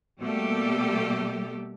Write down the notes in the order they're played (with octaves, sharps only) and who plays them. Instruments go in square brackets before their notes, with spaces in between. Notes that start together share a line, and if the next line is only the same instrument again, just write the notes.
[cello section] B2 G3 A3 A#3 G4 A4